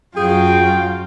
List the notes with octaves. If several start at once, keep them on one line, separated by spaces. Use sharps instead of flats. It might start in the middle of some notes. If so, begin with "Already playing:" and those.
F#2 F#3 F4 G#4 G5